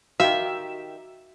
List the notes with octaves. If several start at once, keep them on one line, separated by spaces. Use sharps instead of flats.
D#3 F#4 G4 E5 F5